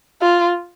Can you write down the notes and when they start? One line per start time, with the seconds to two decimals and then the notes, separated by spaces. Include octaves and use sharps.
0.22 F4